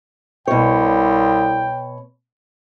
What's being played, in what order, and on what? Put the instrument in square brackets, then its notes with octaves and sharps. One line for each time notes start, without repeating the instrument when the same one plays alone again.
[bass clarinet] C2 [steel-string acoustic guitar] B2 C#5 [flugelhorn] G5